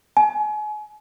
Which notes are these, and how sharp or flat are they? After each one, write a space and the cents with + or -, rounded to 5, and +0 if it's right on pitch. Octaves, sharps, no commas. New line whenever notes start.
G#5 +35